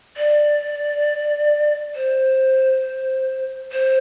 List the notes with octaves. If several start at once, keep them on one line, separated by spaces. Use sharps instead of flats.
D5
C5
C5